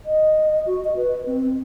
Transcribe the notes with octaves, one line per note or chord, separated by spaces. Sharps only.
D#5
F#4
D#5
B4
C4